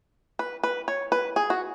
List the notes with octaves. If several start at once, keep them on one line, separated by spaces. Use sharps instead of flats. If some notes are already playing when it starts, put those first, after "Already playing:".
B4
B4
C#5
B4
G#4
F#4